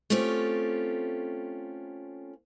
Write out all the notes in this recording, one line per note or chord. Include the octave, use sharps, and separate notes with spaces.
A3 C4 C#4 F4 G4